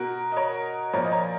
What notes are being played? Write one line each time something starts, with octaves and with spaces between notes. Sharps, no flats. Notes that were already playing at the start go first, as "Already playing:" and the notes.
Already playing: B2 F#4 A#4
D#5
A#4 C#5
A#2 F3 A#4 C#5
D#5
A#4 C#5